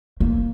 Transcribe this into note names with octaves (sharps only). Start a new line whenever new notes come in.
A#3